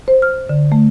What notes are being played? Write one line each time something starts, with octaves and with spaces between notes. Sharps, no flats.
C5
F6
D3
A3